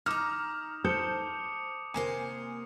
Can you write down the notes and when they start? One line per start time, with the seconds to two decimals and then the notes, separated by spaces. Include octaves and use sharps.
0.06 D#4 A#5 D6 D#6 F6
0.84 A4 C5 D#6 G6 C#7
1.94 C3 A#3 C5 G#5